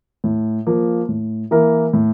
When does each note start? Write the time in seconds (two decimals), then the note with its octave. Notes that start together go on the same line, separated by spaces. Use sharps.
0.24 A2
0.67 F3 A#3
1.09 A2
1.51 E3 A#3 E4 A#4
1.93 A2